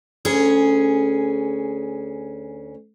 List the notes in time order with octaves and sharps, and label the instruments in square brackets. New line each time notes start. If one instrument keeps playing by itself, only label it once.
[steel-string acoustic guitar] D2 C#4 G#4